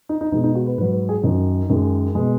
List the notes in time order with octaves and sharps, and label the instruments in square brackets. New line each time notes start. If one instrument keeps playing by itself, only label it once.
[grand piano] D#4
D#4
B2 G#3 D#4
D#4
F#4
B4
G#2 B4
F#3
B4
G#4
F#2 D#3 F#3 D#4
F#2 D#3 G#3
B2 G#3